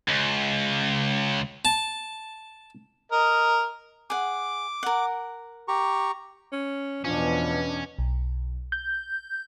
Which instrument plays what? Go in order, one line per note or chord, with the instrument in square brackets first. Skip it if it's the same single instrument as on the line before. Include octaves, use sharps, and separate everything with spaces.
[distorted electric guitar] C#2
[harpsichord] A5
[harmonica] A#4 D#5
[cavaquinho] G#4 F#5 [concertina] D6
[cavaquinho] A#4 F#5
[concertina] G4 A#5 C#6
[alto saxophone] C#4
[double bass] E2 B2 [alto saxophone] F3 [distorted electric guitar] C#4 [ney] D4
[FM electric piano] B1
G6